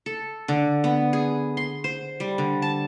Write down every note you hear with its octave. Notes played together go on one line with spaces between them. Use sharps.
A4
D3
B3
G#4
C6
C5
G3
D3
A5